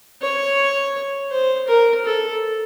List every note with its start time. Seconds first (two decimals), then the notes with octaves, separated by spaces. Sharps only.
0.22 C#5
1.31 C5
1.68 A#4
2.05 A4